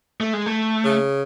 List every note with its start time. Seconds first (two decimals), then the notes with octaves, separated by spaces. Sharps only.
0.20 A3
0.33 G#3
0.46 A3
0.85 C#3